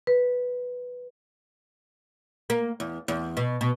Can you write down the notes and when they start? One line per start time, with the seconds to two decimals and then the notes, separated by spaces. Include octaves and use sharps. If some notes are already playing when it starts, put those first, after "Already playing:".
0.07 B4
2.50 A#3
2.80 E2
3.08 E2
3.37 B2
3.61 B2